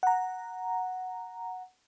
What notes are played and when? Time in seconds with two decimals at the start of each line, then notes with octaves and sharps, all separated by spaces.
0.03 F#5 A#5